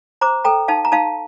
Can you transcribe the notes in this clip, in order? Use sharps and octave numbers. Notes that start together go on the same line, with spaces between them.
C5 A#5 D6
A4 G5 A#5
D#4 F5 A5
A#5
D#4 F5 A5